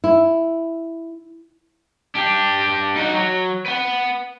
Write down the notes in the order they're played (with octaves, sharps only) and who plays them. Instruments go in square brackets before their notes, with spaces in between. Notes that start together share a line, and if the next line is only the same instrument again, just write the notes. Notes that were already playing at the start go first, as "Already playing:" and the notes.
[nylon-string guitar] E4
[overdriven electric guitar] D4 G4
D#4 F#4
F#3
B4 F#5